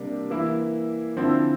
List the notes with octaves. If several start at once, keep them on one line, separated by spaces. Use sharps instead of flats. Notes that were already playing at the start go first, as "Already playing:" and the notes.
Already playing: C3 G3 A#3 D4
E3 A#3 E4
D3 F3 C4 E4